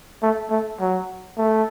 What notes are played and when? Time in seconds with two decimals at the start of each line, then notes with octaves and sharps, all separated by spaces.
0.22 A3
0.51 A3
0.80 F#3
1.38 A3